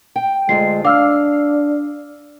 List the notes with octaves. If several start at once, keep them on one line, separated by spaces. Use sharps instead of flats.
G5
D2 G#3 A3 F4 C7
D4 F5 D6 E6 F6